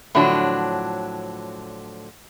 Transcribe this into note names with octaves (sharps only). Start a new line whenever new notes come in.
A2 D3 F3 F#3 D4